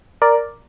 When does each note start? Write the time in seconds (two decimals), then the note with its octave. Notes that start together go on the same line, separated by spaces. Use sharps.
0.22 A#4 D5